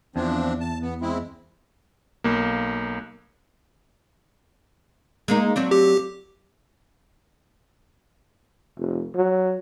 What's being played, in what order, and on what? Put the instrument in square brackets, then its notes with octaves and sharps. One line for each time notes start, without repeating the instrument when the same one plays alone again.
[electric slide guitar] E2 [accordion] F3 C4 D4
[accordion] A5
B3
G#3 C4 E4
[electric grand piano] B1 A#3
[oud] G#3 A#3 D#4
F#3 C4 D4
[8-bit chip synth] G4
[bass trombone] F1
F#3